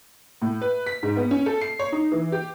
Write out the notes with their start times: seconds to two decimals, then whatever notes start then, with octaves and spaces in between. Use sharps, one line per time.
0.42 A2
0.61 B4
0.86 B6
1.03 G#2
1.17 B3
1.31 C#4
1.46 A4
1.61 C7
1.79 C#5
1.92 D#4
2.12 E3
2.32 G4